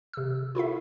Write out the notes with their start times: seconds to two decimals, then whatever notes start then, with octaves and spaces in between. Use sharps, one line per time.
0.13 C3 E6
0.55 E4 F4 A4 E5